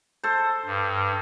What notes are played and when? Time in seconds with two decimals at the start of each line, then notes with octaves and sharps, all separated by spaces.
0.23 A4 C5
0.66 G2